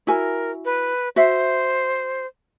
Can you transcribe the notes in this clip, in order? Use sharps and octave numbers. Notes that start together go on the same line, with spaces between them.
E4 F#4 A#4 G#5
B4
F#4 C5 E5